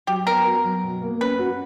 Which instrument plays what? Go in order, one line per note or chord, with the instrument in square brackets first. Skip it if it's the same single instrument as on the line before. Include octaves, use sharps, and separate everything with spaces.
[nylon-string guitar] F#3 [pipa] G4
[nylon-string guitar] B3 [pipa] A#4
[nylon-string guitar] F#4
F#3
B2
A#3
[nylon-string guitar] C#4 [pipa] B4
[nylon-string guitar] F#4